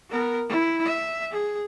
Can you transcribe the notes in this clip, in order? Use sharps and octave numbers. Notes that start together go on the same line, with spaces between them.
B3 A#4
E4
E5
G#4